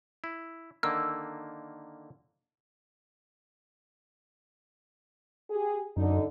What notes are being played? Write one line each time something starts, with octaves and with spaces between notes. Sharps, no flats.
E4
D3 D#3 A#3 E6
G4 G#4
F#2 D3 D#4